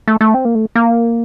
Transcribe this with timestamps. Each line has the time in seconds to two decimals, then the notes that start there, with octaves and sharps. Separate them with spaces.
0.08 A3
0.21 A3
0.34 C4
0.45 A#3
0.55 A3
0.76 A#3